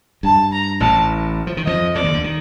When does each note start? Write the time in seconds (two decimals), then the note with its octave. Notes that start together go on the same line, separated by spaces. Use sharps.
0.23 G2 A5
0.52 A#5
0.80 A1 A2 A5
1.47 F3
1.57 D#3
1.66 F2 F3 D#5
1.95 F2 F3 D5
2.04 D#2 D#3
2.13 D2 D3
2.24 D#3